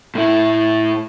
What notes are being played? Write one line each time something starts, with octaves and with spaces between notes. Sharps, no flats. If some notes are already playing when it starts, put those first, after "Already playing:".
A2 E4